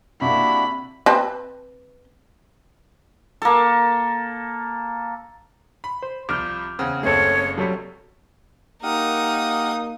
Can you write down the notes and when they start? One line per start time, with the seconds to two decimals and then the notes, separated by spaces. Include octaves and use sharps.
0.21 C3 A#3 D4 E4 F#4 B5
1.06 C4 B4 A5
3.42 A#3 A4
5.84 B5
6.03 C5
6.29 C2 F3 D6 F6 G6
6.79 E2 C#3 C4 F#5
7.03 F#1 A3 C4 G#4 A4 C#5
7.58 C3 F#3 G3 A4 C#5
8.83 A#3 D#4 G4 A#4 F#5 D#6